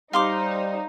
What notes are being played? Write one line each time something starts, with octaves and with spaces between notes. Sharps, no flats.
G3 D#4 C5 F5 C6 D6